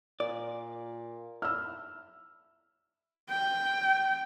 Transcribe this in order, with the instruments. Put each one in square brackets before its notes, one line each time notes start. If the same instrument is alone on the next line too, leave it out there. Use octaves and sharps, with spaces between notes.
[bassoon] A#2 [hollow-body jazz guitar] D5
[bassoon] E4 [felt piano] E6 F6
[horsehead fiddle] G5